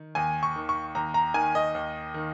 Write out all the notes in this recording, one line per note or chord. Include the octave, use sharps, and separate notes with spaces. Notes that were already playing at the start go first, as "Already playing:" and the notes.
Already playing: D#3
D#2 G#5
C#6
D#3
C#6
D#2 A#5
A#5
D#3 G#5
D#5
D#2
D#3